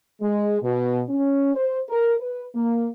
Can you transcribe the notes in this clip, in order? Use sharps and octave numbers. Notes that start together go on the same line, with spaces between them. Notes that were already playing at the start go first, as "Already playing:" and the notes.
G#3
B2
C#4
C5
A#4
B4
A#3